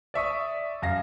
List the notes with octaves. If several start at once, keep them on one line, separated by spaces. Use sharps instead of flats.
D5 E5 C#6 D#6
F#2 F5 A#6